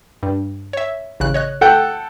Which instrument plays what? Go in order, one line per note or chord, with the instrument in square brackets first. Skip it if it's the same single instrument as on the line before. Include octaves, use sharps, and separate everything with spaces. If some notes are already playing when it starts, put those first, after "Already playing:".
[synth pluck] G2
C#5 E5
A1 C#3 F#6
C#5 D#5 F#6
[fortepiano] A4 F#5 G5